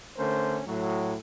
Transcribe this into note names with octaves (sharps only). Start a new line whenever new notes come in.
D3 A3 C#4 A#4 C5
A2 F#3